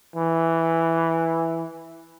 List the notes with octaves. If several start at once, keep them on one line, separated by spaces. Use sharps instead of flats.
E3